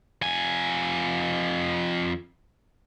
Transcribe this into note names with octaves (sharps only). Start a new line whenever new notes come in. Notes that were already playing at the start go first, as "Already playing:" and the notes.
F2 G#5